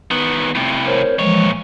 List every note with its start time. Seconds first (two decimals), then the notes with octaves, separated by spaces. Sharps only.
0.11 D#3 B3
0.55 A2 C3
0.86 A#4 C5 C#5
1.19 A#2 E3 F3 G#3 C#5